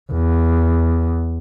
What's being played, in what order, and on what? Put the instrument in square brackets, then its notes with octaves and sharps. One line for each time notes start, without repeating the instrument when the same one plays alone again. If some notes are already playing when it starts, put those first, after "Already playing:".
[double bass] E2